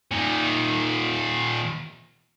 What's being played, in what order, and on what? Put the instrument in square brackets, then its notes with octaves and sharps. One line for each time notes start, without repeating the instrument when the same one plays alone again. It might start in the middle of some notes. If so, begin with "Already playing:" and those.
[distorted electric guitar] A#2 D#3